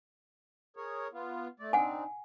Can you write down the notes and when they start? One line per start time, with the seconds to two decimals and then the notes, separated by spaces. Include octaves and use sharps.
0.76 G#4 A#4 C#5
1.13 B3 F4
1.60 A3 D5
1.73 C4 D4 D#4 F#5 G#5